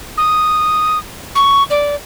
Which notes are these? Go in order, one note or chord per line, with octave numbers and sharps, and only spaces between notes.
D#6
C#6
D5